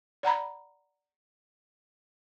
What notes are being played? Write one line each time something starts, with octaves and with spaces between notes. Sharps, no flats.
D5 F#5 A#5 B5